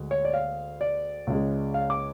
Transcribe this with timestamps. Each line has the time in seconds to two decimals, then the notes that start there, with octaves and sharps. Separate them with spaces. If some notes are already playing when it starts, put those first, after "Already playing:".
Already playing: D2 G#3
0.11 C#5
0.25 D5
0.34 F5
0.81 D5
1.27 C#2 C#3 G#3
1.74 F5
1.90 D6